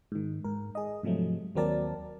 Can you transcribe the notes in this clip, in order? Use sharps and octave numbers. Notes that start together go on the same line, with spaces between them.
G#2 D#3
G#2 A#4
G#4 D#5
G#2 C3 F3 F#3 A3
D#2 F#3 C4 A#4 D5 A5